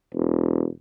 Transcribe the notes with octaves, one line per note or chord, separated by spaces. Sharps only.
E1